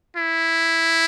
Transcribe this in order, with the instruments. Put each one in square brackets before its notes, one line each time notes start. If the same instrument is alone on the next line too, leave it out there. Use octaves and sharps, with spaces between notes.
[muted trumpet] E4